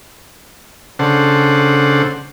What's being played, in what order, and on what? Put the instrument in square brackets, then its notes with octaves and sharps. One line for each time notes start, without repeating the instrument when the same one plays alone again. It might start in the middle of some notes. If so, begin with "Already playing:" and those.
[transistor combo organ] C#3 D4 A4 C5 F#5